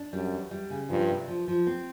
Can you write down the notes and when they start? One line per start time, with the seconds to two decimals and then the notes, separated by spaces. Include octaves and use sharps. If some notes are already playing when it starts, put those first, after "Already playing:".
Already playing: D4
0.13 F#2 G3
0.32 E2
0.51 G3
0.70 C#3
0.90 G2 F3
1.09 C3
1.28 F3
1.48 F3
1.67 C4